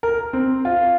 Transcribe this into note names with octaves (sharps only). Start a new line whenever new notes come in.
A#4
C4
F4